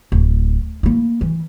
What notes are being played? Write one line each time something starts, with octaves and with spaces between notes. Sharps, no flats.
D1
A#3 E4
E3